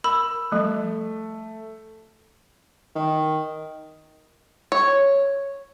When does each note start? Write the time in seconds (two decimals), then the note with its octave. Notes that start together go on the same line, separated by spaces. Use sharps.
0.04 A#4 B5 E6
0.52 F3 G3 A3
2.96 D#3
4.72 C#5